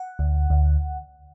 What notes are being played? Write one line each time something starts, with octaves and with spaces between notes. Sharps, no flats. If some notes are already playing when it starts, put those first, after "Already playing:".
Already playing: F#5
D2
D2